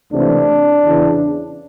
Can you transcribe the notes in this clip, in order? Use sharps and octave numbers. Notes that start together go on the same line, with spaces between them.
C#2 C3 E3 A3 C4 D4
E2 C#3 E3